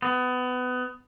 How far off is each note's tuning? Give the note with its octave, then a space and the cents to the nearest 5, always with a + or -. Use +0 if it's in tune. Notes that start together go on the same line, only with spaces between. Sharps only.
B3 +25